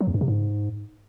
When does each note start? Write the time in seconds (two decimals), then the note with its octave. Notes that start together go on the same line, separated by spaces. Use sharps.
0.01 F#3
0.07 E2
0.14 G2
0.21 C3
0.28 G#2